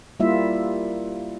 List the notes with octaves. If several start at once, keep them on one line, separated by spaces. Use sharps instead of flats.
G3 A#3 E4 F4 E5